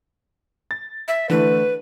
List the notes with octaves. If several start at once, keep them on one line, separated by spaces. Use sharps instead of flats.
A6
E5
D3 E3 A3 B4